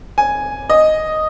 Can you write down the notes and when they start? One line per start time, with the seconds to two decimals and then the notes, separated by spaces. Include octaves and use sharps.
0.18 G#5
0.70 D#5